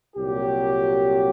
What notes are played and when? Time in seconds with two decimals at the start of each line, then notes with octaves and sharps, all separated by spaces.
0.16 C2 A#2 F#3 G4